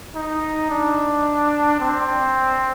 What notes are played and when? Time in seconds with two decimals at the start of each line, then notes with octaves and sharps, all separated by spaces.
0.15 D#4
0.70 D4
1.80 C4